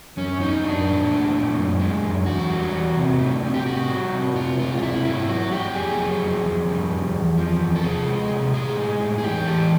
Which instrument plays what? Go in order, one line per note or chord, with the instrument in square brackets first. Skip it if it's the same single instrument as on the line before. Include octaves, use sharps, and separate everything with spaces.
[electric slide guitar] F#2 C#4
F#3 D#4
F#2 D4
A#2
A3
A#2
F#2
G#3
F#2
E2 F#4
G3
E2
C3
A3
C3
G4
C3 F#4
G3
C3
C3 F4
G#3 F4
F4
C3 E4
G#2 E4
F#3 F#4
A3 G4
F2 G#4
F#3
F2
F2
G3
F2
E2
F3
E2
A4
C3 G#4
G#3
C3
A2 G#4
G#3
A2
G#4
E2 G4
E3 A4